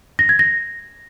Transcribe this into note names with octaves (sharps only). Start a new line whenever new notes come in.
A#6
G#6
A#6